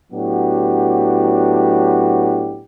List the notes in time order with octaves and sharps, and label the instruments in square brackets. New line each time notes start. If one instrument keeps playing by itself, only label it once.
[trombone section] A2 F#3 B3 D4 F#4 G4